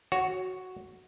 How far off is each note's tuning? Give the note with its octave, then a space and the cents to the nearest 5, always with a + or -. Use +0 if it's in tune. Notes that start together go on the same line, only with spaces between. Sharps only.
F#4 +0 C#5 +0